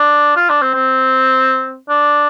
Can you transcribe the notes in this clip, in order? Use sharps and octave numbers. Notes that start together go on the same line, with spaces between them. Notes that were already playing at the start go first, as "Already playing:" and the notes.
Already playing: D4
F4
D4
C4
C4
D4